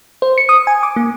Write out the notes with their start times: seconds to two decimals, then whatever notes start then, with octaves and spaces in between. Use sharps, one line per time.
0.22 C5
0.38 C#7
0.49 D#6
0.67 G#5
0.83 D6
0.96 A#3